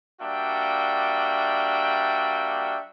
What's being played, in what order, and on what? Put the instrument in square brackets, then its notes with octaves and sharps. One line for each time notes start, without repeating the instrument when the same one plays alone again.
[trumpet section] G3 A#3 D4 F#4 E5 G5